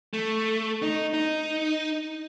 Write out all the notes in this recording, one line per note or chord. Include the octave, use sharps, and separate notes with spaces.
A3
D#4
D#4